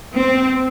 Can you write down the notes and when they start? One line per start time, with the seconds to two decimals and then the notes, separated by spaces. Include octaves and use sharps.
0.14 C4